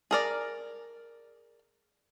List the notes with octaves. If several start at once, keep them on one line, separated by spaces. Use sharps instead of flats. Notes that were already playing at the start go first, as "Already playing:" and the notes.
G#4 A#4 D5